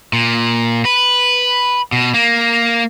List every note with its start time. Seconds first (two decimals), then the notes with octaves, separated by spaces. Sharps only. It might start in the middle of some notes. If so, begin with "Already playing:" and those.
0.13 A#2
0.85 B4
1.92 B2
2.14 A#3